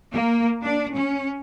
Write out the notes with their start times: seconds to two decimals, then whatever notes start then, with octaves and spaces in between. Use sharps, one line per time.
0.11 A#3
0.63 D4
0.94 C#4